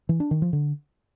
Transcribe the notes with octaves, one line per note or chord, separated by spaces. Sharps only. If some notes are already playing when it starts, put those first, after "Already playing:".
E3
D4
D#3
F3
D3